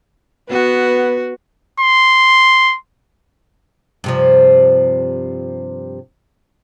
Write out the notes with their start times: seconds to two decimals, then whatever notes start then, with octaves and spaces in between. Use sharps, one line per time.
0.50 B3 F#4
1.80 C6
4.04 G2 C3 F3